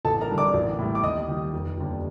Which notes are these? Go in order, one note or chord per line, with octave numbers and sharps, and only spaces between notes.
A1 A4 A5
A#4 A#5
G2 D3 G3
D5 D6
A1
A2 G3
D6
D#2 D#5 D#6
D#3 G3
F1
D#2 D3 G3